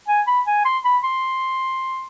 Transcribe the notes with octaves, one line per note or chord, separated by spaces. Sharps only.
G#5
B5
G#5
C6
B5
C6